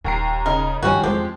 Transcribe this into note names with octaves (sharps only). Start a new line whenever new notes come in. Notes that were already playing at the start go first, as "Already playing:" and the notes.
D#1 D#2 A#5 C7
C#3 D#4 A#4
G2 D#3 F3 G3 C4 C#4 F#4
E2 F3 G#3 C4 G4